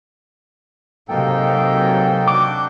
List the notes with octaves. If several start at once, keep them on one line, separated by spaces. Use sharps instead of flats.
G#2 C3 F#3 A#3 D#4 A4 G5
D4 F#4 D6 G6